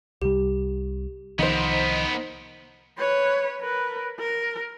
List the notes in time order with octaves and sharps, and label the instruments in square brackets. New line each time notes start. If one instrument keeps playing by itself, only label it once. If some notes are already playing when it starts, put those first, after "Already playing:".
[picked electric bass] C2 C3 G3 [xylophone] G4
[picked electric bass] C2 D#3 F3 [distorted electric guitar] B3 A#4 [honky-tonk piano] D#4 C5
[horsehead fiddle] B4 C#5
A#4 B4
A#4